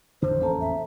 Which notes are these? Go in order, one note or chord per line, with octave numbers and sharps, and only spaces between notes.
A1 F2 D3 C5
E2 A#3 C#4 A4 A5 A#5
E5